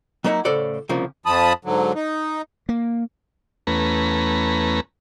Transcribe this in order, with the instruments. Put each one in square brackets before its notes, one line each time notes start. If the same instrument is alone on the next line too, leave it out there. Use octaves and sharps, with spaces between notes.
[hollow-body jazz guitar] F#3 A#3 B3 D#4 E4 F#5
A2 C#3 A4 C5 D5 F#5
C2 C#3 F3 A#3
[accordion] F2 F3 A5 B5 D#6
G#2 D3 F#3
D#4
[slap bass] A#3
[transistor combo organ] E2 A3 C#4 B4 A#5